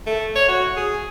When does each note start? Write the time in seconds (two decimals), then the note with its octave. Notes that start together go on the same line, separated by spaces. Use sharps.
0.07 A3
0.35 C#5
0.48 F#4
0.76 G#4